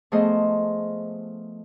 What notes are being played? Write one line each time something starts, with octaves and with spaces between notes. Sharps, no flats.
F3 A3 B3 G#4 C5 D#5